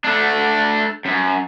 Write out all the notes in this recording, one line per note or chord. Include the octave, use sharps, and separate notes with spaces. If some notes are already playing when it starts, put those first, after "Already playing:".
A3 D4
F#2